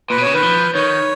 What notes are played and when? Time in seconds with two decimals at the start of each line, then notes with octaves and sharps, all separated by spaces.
0.10 A#2 B4
0.18 B2
0.22 C#3 C#5
0.34 D#3 B4
0.43 F3
0.75 D#3 C#5